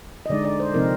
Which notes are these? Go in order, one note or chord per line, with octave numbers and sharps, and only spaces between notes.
D#5
D3 G#3 D#4 D5
D5
C5
C3 F3 C4 D#4 A#4